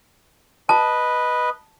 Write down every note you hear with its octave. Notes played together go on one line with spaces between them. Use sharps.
B4 D#5 A5